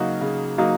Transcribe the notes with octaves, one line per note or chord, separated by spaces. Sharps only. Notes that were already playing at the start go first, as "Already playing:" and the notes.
Already playing: C#3 F#3 A#3 D#4 F#4
C#3
F#3 A#3 D#4 F#4